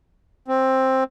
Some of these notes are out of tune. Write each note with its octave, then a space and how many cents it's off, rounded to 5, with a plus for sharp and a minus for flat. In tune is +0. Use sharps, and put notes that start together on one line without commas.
C4 +10